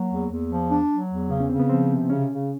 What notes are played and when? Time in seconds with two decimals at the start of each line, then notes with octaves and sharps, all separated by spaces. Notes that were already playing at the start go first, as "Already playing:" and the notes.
Already playing: F#3 A#3
0.10 E2
0.31 E2
0.50 F3
0.71 D4
0.90 F#3
1.10 E2
1.30 C#3 B3
1.40 C#4
1.50 C#3 C4
1.59 B3
1.69 F3 C4
1.89 C3
2.09 C#3 C#4
2.29 C#3